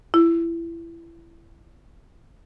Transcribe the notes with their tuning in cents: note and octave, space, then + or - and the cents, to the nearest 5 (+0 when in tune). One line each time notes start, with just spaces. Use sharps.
E4 +25